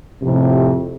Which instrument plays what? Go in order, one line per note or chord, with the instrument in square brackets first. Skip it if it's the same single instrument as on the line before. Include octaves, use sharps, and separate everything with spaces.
[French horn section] F2 A2 C3